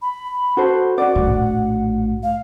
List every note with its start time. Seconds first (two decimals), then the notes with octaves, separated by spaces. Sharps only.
0.02 B5
0.57 F#4 A4 C5
0.98 F#4 D5 F#5
1.16 A#1 A2
2.23 F5